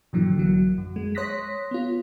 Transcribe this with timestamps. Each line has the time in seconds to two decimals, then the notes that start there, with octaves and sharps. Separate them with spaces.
0.13 G2 A#2 D3 E3 F#3
0.37 A#1 F#3
0.78 F#2
0.96 G#3
1.15 C#5 C6 D#6 F#6 A#6 B6
1.71 B3 F4